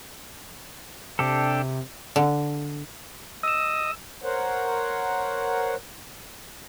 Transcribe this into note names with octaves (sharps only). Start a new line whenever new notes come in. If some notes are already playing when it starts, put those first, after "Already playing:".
C3 D4 G4 A4
D3
D#5 E6 E7
A#4 C5 C#5 F#5